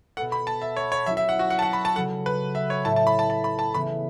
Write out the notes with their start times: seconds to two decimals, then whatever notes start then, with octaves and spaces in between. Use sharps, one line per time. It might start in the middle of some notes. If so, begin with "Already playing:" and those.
0.17 B2 B3 A4 F#5
0.32 B5
0.47 A5
0.62 E5
0.77 C#5
0.92 C#5
1.06 F#3 C#4 E4 E5
1.17 E5
1.29 F#5
1.39 F#4
1.50 F#5
1.59 A5
1.62 F#5
1.73 B5
1.85 A5
1.96 C#3 F#3 C#4 A4 F#5
2.26 B4
2.55 E5
2.70 C#5
2.85 A2 A3 E4 C#5 A5
2.96 A5
3.07 B5
3.19 A5
3.30 A5
3.44 B5
3.59 A5
3.74 C#3 E3 B3 B5